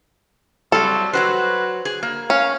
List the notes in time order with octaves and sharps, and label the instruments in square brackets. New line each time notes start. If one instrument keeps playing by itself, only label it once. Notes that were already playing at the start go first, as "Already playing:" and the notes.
[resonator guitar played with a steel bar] F#3 G3 [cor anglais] C4 [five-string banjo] A4
[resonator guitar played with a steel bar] F#3 F#4 C5 [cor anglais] B4
[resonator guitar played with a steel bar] G#4
A#3
[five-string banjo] C#4 [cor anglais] F5